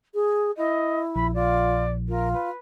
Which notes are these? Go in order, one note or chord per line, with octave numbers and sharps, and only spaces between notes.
G#4
E4 D#5
A#1 B5
F4 D5
F4 A#4
B4